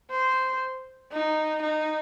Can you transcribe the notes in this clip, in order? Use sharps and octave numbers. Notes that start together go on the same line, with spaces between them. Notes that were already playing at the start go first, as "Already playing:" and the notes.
C5
D#4
D#4